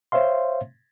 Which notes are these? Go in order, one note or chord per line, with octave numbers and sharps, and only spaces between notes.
C5 C#5 E5 F5 C6